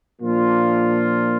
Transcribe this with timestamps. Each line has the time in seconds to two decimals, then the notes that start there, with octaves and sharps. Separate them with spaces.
0.21 A#2 F3 A#3 D4 F4